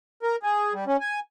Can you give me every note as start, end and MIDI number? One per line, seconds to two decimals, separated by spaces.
0.23 0.36 70
0.43 0.73 68
0.73 0.84 55
0.87 0.97 61
1.01 1.20 80